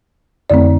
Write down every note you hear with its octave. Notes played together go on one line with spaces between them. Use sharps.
F2 D3 A3 C4 D5